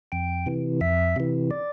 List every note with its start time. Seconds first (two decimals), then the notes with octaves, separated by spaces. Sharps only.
0.12 F2 G5
0.46 C3 E3
0.81 F2 E5
1.16 C3 E3
1.51 D5